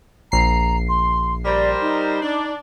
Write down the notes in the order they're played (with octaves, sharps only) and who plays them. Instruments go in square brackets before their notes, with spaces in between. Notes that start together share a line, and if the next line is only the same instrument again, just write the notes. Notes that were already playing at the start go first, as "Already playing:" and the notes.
[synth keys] A#1 C7 [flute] A#5
[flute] C6
[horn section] G3 A#4 C5 [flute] D5
[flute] D#4
[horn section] D4 D5